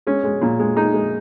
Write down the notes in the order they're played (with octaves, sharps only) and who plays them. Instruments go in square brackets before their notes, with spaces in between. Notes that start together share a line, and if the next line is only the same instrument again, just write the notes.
[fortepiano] G#3 C#4
G#3
A#2
G#3
G#3 D#4
G#3